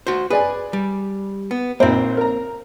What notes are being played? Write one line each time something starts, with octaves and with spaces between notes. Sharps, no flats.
F#4 C5
G#4 B4 D5 G#5
G3
B3
A#1 A#3 C4 D#4 C5
A#4 A#5